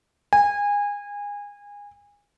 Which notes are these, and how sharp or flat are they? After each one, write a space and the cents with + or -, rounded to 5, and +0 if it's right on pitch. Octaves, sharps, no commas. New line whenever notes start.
G#5 -25